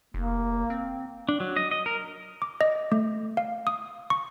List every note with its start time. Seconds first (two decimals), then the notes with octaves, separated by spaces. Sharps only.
0.14 F1 A#3
0.70 C4
1.29 D4
1.40 F#3
1.56 D#5
1.71 D#5
1.86 A#4
2.42 D6
2.61 D#5
2.92 A3
3.37 F5
3.67 D#6
4.10 C#6